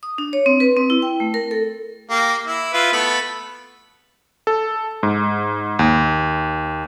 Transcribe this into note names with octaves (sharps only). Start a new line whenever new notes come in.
D#6
D4
C#5
C4
B4
C4
E4
G5
A3
A#4
A4
A#3 G4
E4
E4 F4 B4
A3 B3 B5
A4
G#2
D#2